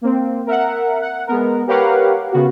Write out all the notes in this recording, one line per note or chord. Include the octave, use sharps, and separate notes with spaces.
A#3 C4
A#4 E5 F#5
F#5
G#3 B3 A#4
G4 A#4 B4 C#5 F5 F#5
C#3 B3 F#4